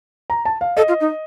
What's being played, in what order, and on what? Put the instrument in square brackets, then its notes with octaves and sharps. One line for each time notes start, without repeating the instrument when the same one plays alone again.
[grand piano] A#5
A5
F5
[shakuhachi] A4 [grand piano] D#5
[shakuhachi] F4
D#4